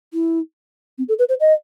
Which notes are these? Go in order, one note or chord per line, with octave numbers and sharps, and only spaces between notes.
E4
C4
A4
B4
C5
D#5